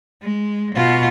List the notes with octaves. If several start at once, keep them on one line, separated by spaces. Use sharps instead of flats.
G#3
B2 F4